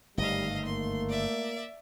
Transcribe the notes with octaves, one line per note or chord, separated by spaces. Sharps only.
G1 G#2 D#3 G3 A3 D#5 F5
A#3 C6
D5 E5